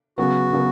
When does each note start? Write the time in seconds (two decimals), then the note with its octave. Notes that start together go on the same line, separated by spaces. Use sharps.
0.18 C#3 F#3 B3 F#4
0.53 C#3 F#3 B3